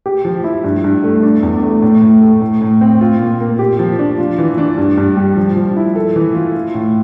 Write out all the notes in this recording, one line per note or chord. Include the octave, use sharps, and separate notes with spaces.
G4
F3
E4
G2
G2
A3
D4
E2
A3
A2
A2
A3
A2
A2
C4
F4
A#2
A#3
G4
F3
D4
F4
E3
D4
G2
G2
G3
F3
F3
E4
A4
E3
F4
F4
A2